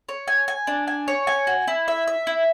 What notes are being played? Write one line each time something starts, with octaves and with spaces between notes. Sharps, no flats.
C#5
G#5
G#5
D4
G#5
C#5
G#5
F#4
E4
E5
E5
E4